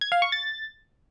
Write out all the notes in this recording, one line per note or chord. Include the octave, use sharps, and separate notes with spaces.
G#6
F5
C#6
A6